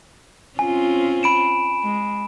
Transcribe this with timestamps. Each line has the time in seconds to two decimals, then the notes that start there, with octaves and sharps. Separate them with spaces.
0.59 C4 C#4 F4 G#5
1.23 B5 D7 E7
1.83 G#3